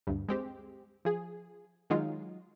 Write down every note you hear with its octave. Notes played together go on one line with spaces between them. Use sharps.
D2 G2
G#3 C4 G4
F3 G#4
D#3 F#3 G#3 D#4 F4